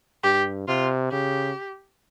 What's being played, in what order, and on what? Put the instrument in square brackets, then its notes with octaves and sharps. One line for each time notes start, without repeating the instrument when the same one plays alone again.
[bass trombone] G2 [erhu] G4
[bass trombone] C3 [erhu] F4
[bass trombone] C#3 [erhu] G4